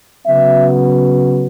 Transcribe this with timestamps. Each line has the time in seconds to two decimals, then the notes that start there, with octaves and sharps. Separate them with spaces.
0.24 C#3 F#3 B3 E5